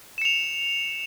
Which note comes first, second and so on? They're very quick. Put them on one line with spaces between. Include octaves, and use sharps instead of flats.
E7 C#7 F7